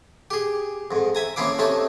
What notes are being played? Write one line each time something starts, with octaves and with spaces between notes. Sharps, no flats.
G4 G#4
F2 G#2
E5 G#5 A#5
F3 A#3 C#4 E4 F5 D6
C3 A3 C#4 D#4 A5